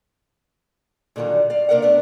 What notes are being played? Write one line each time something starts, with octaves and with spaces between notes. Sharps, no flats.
A#2 D3 D#3 F#3 G3
D5 F5
C3 A#3 D4 A#4 D5 F#5
A3 B3 D4